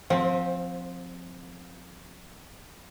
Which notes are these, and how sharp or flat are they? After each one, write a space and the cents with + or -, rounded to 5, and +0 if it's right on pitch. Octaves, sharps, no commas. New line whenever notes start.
F3 +25 C4 +0